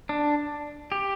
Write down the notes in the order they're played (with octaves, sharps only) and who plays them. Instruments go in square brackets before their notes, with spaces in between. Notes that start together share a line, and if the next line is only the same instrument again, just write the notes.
[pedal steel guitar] D4
G4